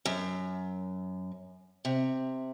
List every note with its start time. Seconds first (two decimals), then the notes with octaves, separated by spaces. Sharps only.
0.05 F#2
1.85 C3